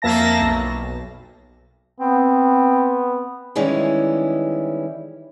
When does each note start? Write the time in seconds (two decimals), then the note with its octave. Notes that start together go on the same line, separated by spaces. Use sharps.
0.02 F2 A#3 E5 A5 A#6
0.41 B1
2.00 B3 C4
3.55 D#3 E3 G3 G#3 C#4 E4